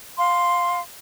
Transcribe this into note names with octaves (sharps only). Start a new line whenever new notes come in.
F5 C6